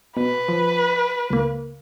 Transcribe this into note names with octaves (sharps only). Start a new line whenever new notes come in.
B2 B4
F3
C#2 A#3